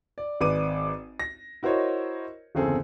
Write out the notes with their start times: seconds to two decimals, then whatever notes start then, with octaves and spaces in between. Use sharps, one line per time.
0.18 D5
0.41 G#1 B4 D5 D6 D#7
1.19 A#6
1.63 E4 F#4 A#4 C5 C#5 D#5
2.55 G1 E2 C#3 C4 G#4 A4